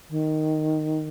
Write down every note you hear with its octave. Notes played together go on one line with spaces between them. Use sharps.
D#3